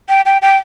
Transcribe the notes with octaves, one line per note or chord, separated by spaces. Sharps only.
G5
G5
G5